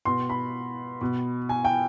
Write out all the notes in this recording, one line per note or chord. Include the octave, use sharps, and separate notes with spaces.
B2 C6
B5
B2
G#5
G5